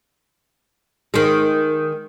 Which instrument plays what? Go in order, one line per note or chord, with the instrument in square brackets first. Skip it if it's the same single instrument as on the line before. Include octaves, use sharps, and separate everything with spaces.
[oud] D#3 G#3